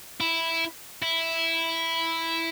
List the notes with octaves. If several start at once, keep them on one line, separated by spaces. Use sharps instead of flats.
E4
E4